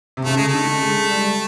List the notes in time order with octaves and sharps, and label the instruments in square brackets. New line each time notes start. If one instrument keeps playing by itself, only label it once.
[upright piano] C3
[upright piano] C#3 [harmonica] A3
[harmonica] G#3
A3
[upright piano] D3
G#3
G3